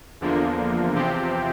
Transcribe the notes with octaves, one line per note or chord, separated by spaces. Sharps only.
E2 D3 F3 A#3
E2 C3 F3 C4 G4